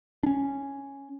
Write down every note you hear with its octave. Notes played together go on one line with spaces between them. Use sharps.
C#4 D4